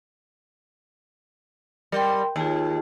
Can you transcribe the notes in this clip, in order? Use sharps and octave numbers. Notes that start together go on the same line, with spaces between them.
G3 A#4 G5 C6
D#2 F4 G#4 A5